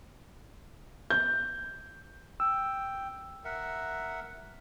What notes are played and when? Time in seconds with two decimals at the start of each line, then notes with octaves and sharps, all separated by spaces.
1.10 G6
2.40 G5 E6
3.45 A#4 E5 F#5